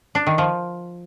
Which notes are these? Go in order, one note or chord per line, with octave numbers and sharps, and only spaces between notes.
D4
D#3
F3